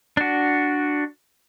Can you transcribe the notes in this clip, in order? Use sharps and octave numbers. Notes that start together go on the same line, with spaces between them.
D4 F#4